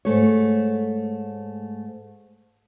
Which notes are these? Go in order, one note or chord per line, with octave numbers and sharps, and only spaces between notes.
G#2 A3 C#5